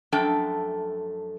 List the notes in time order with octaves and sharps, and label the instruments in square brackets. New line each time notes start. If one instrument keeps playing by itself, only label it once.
[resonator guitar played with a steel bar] F#2 F3 A3 D4 A4 G5